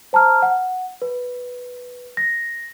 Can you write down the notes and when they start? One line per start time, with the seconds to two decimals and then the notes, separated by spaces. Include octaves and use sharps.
0.13 C5 A5 A#5 F6
0.42 F#5
1.02 B4
2.17 A#6